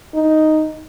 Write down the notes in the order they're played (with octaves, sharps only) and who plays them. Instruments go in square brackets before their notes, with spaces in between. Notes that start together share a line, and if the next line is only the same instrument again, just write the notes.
[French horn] D#4